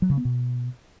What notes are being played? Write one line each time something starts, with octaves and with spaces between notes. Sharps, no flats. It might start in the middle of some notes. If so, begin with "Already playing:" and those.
F#3
C#3
B3
B2